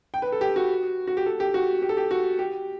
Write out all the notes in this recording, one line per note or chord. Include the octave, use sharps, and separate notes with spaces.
G5
B4
A4
G4
F#4
F#4
G4
A4
G4
F#4
G4
A4
G4
F#4
G4